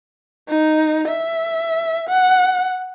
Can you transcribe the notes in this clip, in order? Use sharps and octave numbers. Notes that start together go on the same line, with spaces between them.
D#4
E5
F#5